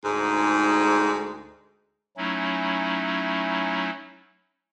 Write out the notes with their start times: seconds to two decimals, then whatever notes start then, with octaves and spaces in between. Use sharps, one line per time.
0.03 D2 G#2
2.17 F#3 A3 C#4 D#4 E4